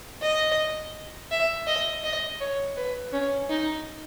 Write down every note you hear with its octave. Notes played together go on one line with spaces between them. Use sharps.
D#5
E5
D#5
D#5
C#5
B4
C#4
D#4